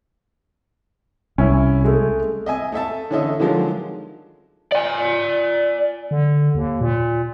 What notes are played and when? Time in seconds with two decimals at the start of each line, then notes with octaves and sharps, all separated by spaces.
1.38 C2 C#4 E4
1.84 G#3 A3
2.46 D#5 E5 G#5
2.72 A3 A4 E5 A5
3.11 D3 E3 C#4 A4 D#5 E5
3.40 D3 D#3 F3 F#3 G#3
4.72 D5 G#5
6.11 D3
6.55 D#2
6.81 A#2